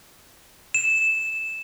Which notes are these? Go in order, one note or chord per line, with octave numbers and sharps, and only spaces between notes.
E7